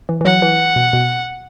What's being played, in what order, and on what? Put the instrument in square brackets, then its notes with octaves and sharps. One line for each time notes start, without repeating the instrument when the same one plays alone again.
[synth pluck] E3
E3
[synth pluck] F#3 [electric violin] F#5
[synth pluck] E3
B2
B2